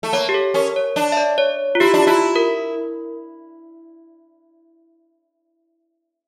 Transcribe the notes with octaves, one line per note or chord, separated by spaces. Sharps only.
A3
A#3 C#5
G4
A4
C#4 A#4
C#5
D4 C#5
E5
D5
C#5
F4
E4 G4
D4
G4
E4 F4
A#4